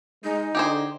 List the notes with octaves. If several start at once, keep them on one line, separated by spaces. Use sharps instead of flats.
G#3 D#4
D3 G4 G#4 C5